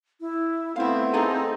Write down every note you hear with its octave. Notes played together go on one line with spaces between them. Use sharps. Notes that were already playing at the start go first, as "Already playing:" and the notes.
E4
A3 B3 C4 E4 F5
D#4 G#4 A4 G#5